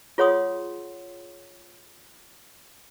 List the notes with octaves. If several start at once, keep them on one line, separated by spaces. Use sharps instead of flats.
F4 G#4 C#5 F#5 C6 D#6